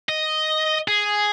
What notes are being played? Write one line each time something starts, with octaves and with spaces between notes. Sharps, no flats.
D#5
G#4